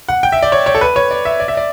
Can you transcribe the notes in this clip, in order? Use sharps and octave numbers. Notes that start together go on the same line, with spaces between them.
F#5
G5
E5
D5
C#5
C#5
A4
B4
C#5
D5
E5
D5
E5
D5